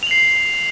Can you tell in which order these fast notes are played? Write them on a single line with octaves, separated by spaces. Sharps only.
F7 F#7 C7